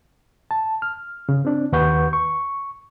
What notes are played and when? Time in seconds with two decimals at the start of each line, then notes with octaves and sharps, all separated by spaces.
0.51 A5
0.82 F6
1.29 C#3
1.45 C4 D4
1.72 D#2 D#3 B4 F#5 C#6 G6
2.13 C#6